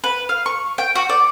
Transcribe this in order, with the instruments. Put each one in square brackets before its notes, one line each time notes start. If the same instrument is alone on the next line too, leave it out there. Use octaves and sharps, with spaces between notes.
[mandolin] B4
F5
C#6
G5
F#4
D5